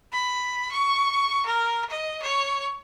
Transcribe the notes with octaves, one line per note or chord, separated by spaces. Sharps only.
B5
C#6
A#4
D#5
C#5